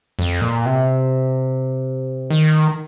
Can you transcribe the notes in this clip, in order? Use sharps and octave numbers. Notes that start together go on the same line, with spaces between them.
F2
A#2
C3
D#3